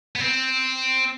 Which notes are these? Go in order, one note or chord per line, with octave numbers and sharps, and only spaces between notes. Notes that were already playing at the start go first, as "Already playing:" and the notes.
B3
C4